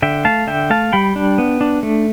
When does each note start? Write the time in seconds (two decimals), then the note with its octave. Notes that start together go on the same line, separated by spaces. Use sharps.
0.02 D3 E5 G5
0.25 A3 F5 A5
0.47 D3 E5 G5
0.70 A3 F5 A5
0.93 G3 G5 B5
1.16 D4
1.38 B3
1.61 D4
1.83 A3